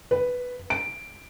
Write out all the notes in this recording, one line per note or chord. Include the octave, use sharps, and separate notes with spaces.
B4
D7